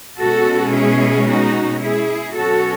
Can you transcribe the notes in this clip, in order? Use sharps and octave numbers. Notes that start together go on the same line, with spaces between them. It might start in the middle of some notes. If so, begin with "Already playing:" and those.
B2 G#3 C#4 F#4 A4
E4 G#4
D#4 F#4
E4 G#4
B2 F#3 C#4 F#4 A4